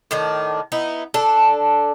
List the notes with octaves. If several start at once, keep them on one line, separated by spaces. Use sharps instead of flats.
A2 D#3 D4
B3 D#4 E4
D4 A4